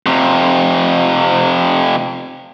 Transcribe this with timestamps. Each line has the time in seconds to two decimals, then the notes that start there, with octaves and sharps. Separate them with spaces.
0.06 F2 C3